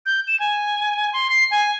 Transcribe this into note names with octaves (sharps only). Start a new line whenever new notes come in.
G6
E7
G#5
C6
C7
G#5